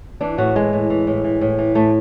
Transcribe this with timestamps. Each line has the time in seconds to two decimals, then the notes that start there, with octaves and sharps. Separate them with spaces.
0.21 E3 D4
0.38 A2 F#4
0.55 E3 G#3
0.73 A2
0.90 E3
1.07 A2
1.24 E3
1.41 A2
1.59 E3
1.75 A2 A3